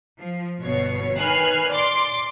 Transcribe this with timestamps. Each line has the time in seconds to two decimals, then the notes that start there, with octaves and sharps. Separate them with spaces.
0.19 F3
0.62 G1 B2 C#5
1.18 D#3 B4 G#5 F6 F#6 C7
1.70 D5 C6 D6